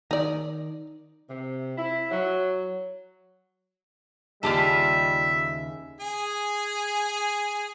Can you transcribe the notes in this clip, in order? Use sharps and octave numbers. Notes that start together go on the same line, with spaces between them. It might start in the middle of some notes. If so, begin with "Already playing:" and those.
D#3 D#4 D5
C3
E4
F#3
D#2 C#3 G3 F4 G4 E5 A5
G#4 G#5